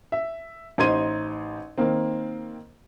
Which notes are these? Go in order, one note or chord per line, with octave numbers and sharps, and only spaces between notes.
E5
A1 D#4 C5 C6 G#6 D#7
D#3 A#3 C4